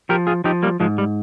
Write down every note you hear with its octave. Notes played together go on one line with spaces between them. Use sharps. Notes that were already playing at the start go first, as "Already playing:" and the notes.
F3 G4 A#4
F4 G#4
F3 D#4 G4
G3 A#3
G#2 F3 G#3
G3